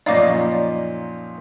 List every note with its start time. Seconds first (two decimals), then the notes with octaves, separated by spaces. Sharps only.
0.06 F#2 A#2 F3 D#4 C#5 D5 F5 D6